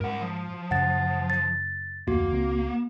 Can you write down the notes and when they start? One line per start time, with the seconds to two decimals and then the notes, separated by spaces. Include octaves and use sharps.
0.01 G#2 A#4 F#5
0.22 F3
0.71 F#2 C#3 F#3 F#5 A6
1.30 A6
2.08 D1 F2 A2 A#3 F#4
2.32 C#2 C4